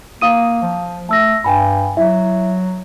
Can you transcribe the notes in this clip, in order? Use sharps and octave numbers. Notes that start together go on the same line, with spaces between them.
A#3 F5 D#6 D#7
F3
A3 A5 E6 A#6
G2 G5 G#5 B5
F#3 E4 E5